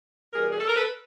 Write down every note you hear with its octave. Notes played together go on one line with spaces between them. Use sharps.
E2 B2 G3 G#4 A#4
G#4
A4
A#4
A4 B4